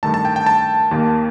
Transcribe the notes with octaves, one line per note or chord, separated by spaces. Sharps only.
G2 D#3 A3 A5
A5
G5
G5
A5
D#2 D#3 A#3